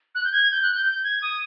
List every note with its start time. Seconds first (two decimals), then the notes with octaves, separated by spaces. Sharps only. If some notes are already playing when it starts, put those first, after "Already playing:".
0.15 F#6
0.24 G6
0.32 G#6
0.51 G6
0.63 F#6
0.74 G6
0.86 G6
1.04 G#6
1.22 D#6